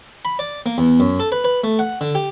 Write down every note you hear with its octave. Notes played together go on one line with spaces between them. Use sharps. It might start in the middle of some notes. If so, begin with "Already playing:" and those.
B5
D5
A#3
E2
F#2
A4
B4
B4
A3
F#5
D3
G4